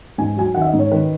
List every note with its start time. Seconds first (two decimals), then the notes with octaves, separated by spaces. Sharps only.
0.18 G#2 G#5
0.36 F#3 G#5
0.55 D#3 F#5
0.62 E5
0.67 D#5
0.73 G#2
0.79 C#5
0.91 D#3 B4